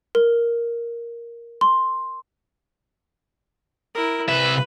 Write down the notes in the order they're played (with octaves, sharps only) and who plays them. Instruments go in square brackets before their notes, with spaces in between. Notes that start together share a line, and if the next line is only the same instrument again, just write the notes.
[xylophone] A#4
C6
[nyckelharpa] E4 A#4
[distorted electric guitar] C2 E5 [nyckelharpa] B4